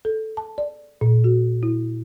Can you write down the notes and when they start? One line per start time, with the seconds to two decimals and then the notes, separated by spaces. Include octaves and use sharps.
0.05 A4
0.37 A5
0.58 D5
1.01 A#2
1.24 F#4
1.63 E4